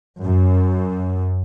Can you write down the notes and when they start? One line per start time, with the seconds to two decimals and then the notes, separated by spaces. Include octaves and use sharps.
0.22 F#2